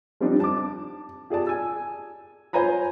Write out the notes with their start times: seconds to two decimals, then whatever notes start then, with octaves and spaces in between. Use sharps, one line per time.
0.21 F3 G3 C4 D4 D#4 G4
0.40 A5 D6
1.30 G4 G#4 D5 A5
1.47 G#5 E6
2.53 C5 C#5 G#5 A#5 B5